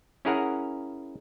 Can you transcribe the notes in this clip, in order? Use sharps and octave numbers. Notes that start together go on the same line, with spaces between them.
C#4 E4 G#4 A#4 F#5 A#5